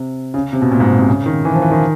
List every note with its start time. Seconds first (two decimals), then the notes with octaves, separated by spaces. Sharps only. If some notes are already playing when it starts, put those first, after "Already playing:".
Already playing: C3
0.34 C#3
0.53 C3
0.62 B2
0.71 A#2
0.80 G#2
0.98 C3
1.07 C#3
1.26 D#3
1.45 E3
1.54 F3
1.62 E3
1.71 D#3